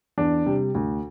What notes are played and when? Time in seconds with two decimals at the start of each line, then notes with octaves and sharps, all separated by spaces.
0.18 E2 D4
0.46 C3 G3
0.75 D2